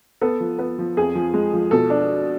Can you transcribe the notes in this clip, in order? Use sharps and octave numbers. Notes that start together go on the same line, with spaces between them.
B3 A4
F3
B3
F3
F2 G#4
F3
G#3
F3
B2 A4
D4